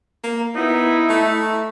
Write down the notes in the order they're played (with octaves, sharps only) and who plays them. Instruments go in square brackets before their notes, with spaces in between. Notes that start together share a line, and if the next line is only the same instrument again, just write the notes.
[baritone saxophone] A#3
[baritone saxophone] B3 [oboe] D#4 [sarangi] E4
[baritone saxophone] A3